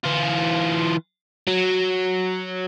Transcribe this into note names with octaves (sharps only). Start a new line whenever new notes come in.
E3 F4
F#3